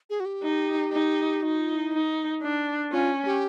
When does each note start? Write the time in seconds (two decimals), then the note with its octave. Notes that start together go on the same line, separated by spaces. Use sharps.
0.10 G#4
0.20 F#4
0.25 G4
0.43 D#4
0.92 D#4
1.43 D#4 F#4
1.59 F4
1.76 E4
1.93 D#4
2.42 D4
2.92 C#4 F4
3.26 G4